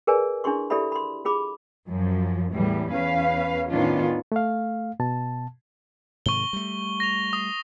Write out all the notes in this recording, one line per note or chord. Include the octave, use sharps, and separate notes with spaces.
G#4 A#4 B4 D5 G#5
D4 E4 G#4 C6 C#6
E4 G4 A4 D5 E5 B5
B5 C6
F4 G#4 B5 D6
F#2 F3
E2 A2 E3 G3
E2 C#4 B4 F5
A2 D#3 B3 C#4 D4 F4
A3 F5
B2 A5
G#2 C3 D#3 C#6 G7
G3 A3
A#6 F7
D#6